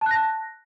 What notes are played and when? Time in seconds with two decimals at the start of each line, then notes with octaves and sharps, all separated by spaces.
0.01 A5
0.06 F#6
0.11 A#6